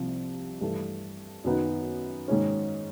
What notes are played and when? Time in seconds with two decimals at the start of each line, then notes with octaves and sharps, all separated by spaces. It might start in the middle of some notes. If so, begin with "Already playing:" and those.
Already playing: C2 C3 F3
0.61 G2 E3 A3
1.44 F#2 D#3 F#3 B3 D#4
2.28 G#2 D#3 G#3 C#4